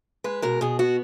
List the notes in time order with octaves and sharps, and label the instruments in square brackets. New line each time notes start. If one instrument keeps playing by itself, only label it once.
[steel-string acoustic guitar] G#3 B4
B2 A#4
B2 G#4
B3 F#4